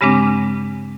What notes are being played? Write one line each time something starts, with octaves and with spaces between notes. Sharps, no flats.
G2 C#3 G#3 C4 D4